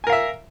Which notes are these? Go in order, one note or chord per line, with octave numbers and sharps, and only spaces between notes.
A#4 E5 F5 G#5